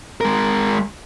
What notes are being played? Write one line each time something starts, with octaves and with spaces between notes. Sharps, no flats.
G#3 A#4